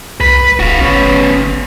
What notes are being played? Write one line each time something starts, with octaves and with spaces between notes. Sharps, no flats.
C2 B4
D1 F#4 F5
G1 B3 C#4